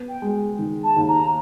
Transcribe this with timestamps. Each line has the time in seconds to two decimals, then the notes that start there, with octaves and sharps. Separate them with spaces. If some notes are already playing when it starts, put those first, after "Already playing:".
Already playing: B3
0.09 G5
0.22 G#3
0.59 D#3
0.84 A5
0.96 D#2
1.08 A#5